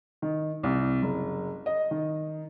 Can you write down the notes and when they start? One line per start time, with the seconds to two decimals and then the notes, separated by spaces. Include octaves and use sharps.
0.22 D#3
0.63 C2
1.02 F#1
1.66 D#5
1.91 D#3